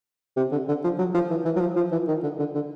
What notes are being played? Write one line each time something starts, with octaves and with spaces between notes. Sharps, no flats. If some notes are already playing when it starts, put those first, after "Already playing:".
C3
D3
D3
F3
F#3
F3
E3
E3
F#3
F3
F3
E3
D#3
D3
D3
D3